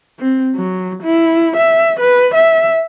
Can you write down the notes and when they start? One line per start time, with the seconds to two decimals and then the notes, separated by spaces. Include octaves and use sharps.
0.19 C4
0.56 F#3
1.03 E4
1.56 E5
2.00 B4
2.35 E5